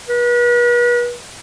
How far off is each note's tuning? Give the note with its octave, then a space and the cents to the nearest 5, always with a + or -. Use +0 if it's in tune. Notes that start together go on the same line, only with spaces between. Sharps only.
B4 -40